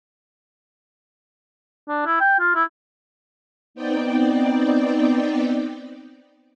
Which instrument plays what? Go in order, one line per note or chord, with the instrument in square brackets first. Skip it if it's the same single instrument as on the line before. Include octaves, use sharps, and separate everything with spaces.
[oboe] D4
E4
G5
F4
E4
[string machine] B3 C4 D#4 D5 G5